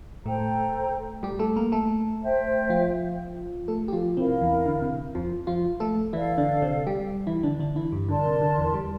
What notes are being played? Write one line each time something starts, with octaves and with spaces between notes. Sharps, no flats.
A2 A3 A4 C5 G5 A#5
G3 G4
A3 A4
A#3 A#4
A3 A4
C5 E5 G5
F3 F4
A3 A4
G4
F3 F4
C3 C4 E4 A#4 F5
E2 E3
D3
C3
F2 F3
F3 F4
A3 A4
E3 E4 A4 D5 F5
D3 D4
C3 C4
G3 G4
E3 E4
D3 D4
D3 D4
E3 E4
G2 G3
D3 A#4 D5 A5 C6
C3
D3
E2 E3
G3